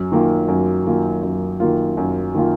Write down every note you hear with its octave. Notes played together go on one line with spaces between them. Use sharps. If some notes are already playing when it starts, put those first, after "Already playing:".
Already playing: F#2
D#3 A#3 F4
F#2
D#3 A#3 F4
F#2
D#3 A#3 F4
F#2
D#3 A#3 F4